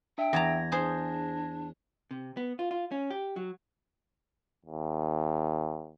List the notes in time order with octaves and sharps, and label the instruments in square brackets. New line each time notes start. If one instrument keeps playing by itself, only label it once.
[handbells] D4 E5 [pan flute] G5
[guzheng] E2 A5 A#5 [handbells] G#6 A#6
[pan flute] D4 [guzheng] G#4 C5
[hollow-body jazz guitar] C3
B3
F4
F4
C#4
G4
F#3
[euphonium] D#2